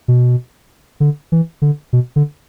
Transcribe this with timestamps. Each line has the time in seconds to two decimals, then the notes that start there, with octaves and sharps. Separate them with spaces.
0.08 B2
1.00 D3
1.32 E3
1.62 D3
1.93 B2
2.16 D3